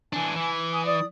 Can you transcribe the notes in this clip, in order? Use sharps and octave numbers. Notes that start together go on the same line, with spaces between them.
E3 D4 G#5
E3
G#5 D#6
D5 D#6